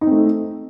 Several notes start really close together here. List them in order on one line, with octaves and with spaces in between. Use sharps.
D#4 C4 A3